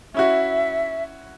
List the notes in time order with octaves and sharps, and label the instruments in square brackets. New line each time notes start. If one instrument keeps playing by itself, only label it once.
[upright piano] C#4 E4 F#4 [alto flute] E5